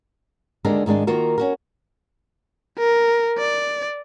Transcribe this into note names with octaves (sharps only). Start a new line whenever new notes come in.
D#2 D3 G#3 D4 A#4
G#2 D#3 G#3 D4
D#3 A#3 F4 F#4 A#4
C#4 F#4 A#4
A#4
D5